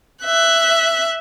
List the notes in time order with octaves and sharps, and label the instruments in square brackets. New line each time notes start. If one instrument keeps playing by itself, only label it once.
[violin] E5 F#6